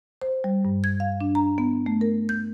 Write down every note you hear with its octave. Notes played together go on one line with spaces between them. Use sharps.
C5
G3
G2
G#6
F5
D4
A#5
B3
A3
A#4
G6